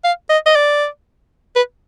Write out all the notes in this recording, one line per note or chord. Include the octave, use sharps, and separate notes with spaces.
F5
D#5
D#5
D5
B4